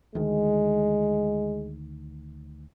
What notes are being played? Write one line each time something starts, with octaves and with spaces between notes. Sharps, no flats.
D2 D#3 G#3